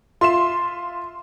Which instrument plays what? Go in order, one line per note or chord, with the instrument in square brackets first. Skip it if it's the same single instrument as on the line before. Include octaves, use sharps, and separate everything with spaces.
[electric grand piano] F4 E5 E7 [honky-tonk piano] C6